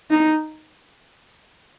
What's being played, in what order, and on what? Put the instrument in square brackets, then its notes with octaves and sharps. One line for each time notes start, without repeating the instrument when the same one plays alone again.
[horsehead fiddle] D#4